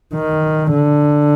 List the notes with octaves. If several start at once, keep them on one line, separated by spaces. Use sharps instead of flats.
D#3
D3